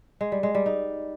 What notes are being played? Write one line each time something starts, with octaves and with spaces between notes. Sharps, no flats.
G#3
G3
G#3
G3
D#4